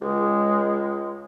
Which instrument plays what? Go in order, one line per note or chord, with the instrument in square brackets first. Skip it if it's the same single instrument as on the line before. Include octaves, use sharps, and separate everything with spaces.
[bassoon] C#2 [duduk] G#3